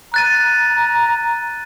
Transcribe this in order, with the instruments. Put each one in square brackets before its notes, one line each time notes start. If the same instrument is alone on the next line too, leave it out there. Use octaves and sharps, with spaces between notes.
[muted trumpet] A#5 [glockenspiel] F#6 A6 D#7